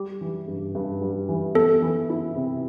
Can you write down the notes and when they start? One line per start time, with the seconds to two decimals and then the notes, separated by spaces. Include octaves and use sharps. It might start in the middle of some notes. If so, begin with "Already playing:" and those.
Already playing: G3 G4
0.21 E3
0.48 G2
0.75 G2
1.01 G3
1.29 E3
1.55 B3 A4
1.82 E3
2.10 E4
2.36 C3